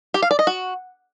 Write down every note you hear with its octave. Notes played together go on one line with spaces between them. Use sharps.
G4
F5
D5
D#5
F#4